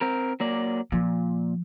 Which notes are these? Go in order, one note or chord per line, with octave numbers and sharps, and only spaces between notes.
C4 A#4
F#3 A#3 D5
A#2 F3